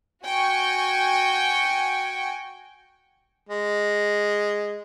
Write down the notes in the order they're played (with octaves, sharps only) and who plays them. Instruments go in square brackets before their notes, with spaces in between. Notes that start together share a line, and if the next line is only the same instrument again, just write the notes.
[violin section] F#4 G5 G#5 C#6
[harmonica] G#3